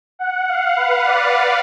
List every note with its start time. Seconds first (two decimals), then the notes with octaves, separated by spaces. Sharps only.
0.19 F#5
0.48 F5
0.76 B4
1.05 D5